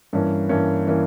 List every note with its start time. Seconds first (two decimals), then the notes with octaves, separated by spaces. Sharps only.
0.13 G2 E3 A#3 C#4
0.49 G2 E3 A#3 C#4
0.87 E3 A#3 C#4